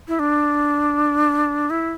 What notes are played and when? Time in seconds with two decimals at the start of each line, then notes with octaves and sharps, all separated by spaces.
0.08 E4
0.19 D4
1.70 E4